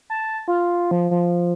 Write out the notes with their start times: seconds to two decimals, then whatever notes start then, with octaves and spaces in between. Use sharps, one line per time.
0.10 A5
0.48 F4
0.91 F3
1.11 F3